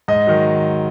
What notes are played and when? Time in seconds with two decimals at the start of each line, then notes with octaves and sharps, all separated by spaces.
0.08 G#2 D#5
0.27 D#3 F#3